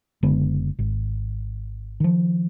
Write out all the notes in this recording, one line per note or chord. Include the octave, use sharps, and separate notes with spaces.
F#1 D3 G#3 B3
G#1
D#3 F3